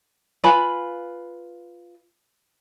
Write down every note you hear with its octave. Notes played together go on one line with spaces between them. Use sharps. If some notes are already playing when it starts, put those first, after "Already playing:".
F4 B4 G#5 B5